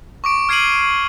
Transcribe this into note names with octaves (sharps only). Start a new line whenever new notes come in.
C#6 D6 D7
F6 G#6 C7 D7 D#7 F#7